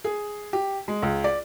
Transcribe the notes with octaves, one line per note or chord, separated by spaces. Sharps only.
G#4
G4
G#3
C#2
D5